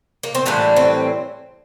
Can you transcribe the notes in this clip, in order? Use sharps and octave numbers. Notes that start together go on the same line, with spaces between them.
A#3
C4
A2 E3 G3 A#3 D4
C4